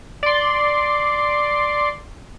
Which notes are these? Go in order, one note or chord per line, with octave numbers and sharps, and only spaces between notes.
D5 C6